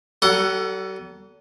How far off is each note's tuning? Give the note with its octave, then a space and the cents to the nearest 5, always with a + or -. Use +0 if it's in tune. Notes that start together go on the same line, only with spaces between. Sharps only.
G3 -45 A4 +30 F#5 +0